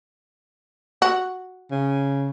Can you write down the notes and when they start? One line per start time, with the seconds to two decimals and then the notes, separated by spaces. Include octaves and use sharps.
1.02 F#4
1.71 C#3